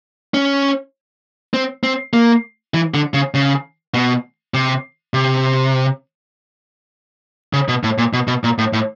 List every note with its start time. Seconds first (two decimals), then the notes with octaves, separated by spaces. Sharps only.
0.34 C#4
1.54 C4
1.83 C4
2.13 A#3
2.74 E3
2.94 D3
3.14 C#3
3.34 C#3
3.94 B2
4.54 C3
5.14 C3
7.53 C#3
7.68 B2
7.83 A2
7.98 A#2
8.13 B2
8.27 B2
8.44 A#2
8.58 A2
8.73 A2